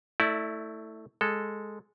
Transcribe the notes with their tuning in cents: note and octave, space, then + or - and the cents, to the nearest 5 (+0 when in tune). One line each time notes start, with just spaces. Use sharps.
A3 +10 E4 -15 D5 +0
G#3 +0 A4 +0